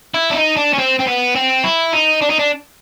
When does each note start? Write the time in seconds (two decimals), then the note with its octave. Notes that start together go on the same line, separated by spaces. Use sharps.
0.14 E4
0.31 D4
0.36 D#4
0.57 D4
0.73 C#4
0.78 C4
0.99 C4
1.07 B3
1.35 C4
1.64 E4
1.93 D#4
2.22 D4
2.30 D#4
2.39 D4